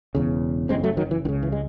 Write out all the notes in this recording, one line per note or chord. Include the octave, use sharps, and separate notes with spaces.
E1 E2 C#3
F#1 E2 C#3 G#3 C4
F#3 A3
D#3 F#3
E3
C#2 C#3 D#3
E3
G#3